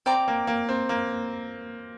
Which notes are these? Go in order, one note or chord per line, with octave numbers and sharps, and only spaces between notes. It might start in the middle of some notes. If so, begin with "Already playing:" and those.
C4 D5 G5 A#5 D6
A#3
A#3
C4
A#3